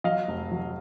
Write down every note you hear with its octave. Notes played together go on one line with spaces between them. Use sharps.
F#3 D#5 F5
F1
F#3